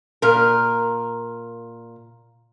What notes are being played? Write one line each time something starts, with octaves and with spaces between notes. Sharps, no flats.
A#2 A#4